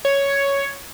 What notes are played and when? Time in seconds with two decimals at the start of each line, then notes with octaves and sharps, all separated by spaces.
0.05 C#5